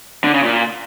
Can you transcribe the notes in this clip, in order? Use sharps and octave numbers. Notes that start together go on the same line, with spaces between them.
D3
C#3
A#2